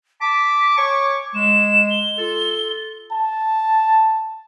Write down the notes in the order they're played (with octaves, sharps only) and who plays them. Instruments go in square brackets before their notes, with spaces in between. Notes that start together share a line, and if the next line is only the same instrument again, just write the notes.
[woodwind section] A5 D6 [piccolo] B6
[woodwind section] C#5 G#5 C#6 [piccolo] D6
[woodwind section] G#3 [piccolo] E7
[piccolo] G7
[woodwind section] F4 A4
[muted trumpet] A5